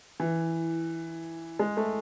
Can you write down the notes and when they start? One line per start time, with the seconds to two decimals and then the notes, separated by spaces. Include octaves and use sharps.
0.20 E3
1.59 G#3
1.77 A3